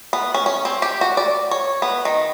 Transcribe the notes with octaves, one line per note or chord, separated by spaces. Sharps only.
B3
C#4
C#4
C4
G4
F#4
D5
C#5
B3
D#3